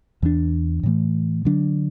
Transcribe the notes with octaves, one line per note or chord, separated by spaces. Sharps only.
E2 E3 A3 D4
A2 E3 A3
D3 F#3 D4